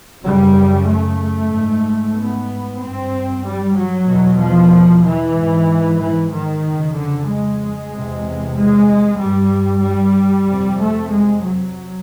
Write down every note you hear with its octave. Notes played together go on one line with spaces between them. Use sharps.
F#2 C#3 G3
A3
G#2
B3
G2 C4
G3
F#3
E2 B2
F3
E3
G#2
E3
D#3
F2 C#3
D3
G#3
E2 C3
G#3
G2 G3
G3
F2 C3
A3
G#3
F#3